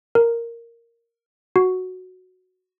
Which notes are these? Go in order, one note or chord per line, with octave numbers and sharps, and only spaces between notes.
A#4
F#4